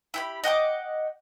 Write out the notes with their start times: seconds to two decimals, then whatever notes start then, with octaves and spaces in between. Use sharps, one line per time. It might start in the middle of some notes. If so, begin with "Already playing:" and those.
0.14 E4 G4 B5
0.44 D#5 F#5 G5 D6